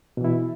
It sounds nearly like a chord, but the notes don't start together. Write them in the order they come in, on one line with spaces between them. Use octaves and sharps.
B2 E3 E4